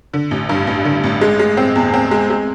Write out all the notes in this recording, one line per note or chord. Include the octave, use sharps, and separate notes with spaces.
D3
A1
G2
A1
D3
A1
G#3
G#3
C4
E2
C4
G#3
G#3